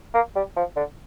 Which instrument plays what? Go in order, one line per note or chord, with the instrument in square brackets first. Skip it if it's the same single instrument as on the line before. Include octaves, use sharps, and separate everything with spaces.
[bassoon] A#3
G3
F3
D3